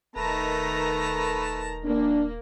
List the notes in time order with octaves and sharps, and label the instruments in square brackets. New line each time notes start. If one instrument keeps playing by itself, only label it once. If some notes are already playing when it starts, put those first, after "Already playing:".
[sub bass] D#1 [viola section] D#3 A#5 [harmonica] A3 B4 A5
[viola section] A#3 [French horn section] D4